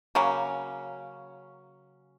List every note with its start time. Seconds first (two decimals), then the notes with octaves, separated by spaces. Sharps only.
0.15 C#3 F#3 A#3 C#4